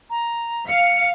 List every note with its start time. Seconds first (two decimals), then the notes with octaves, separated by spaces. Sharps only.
0.10 A#5
0.68 F5 C#7